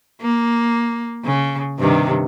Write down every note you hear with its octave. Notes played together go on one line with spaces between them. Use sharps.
A#3
C#3
G2 C3 D#3